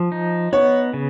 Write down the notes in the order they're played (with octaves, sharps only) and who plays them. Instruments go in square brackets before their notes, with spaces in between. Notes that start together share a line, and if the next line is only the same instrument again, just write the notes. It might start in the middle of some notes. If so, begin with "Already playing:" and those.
Already playing: [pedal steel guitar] F3
D#4
[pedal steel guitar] B3 [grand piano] C#5
[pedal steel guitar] C#3